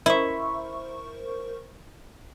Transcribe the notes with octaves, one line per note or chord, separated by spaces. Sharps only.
E4 A#4 C5 E5 C#6